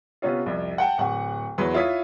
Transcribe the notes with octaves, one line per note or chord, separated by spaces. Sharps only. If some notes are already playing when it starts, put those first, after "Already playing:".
C3 B3 C#4 F4
C2 F2
F#5 G5 A5
D1 F#5 C#6
E2 F#3 G#4 B4 C#5 C6
E4 F4 C#5 D#6 B6